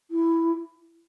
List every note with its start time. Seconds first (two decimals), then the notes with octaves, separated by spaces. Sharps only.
0.11 E4